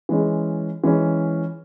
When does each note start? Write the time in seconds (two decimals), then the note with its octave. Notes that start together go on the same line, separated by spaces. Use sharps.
0.09 E3 G#3 C#4
0.84 E3 G#3 C#4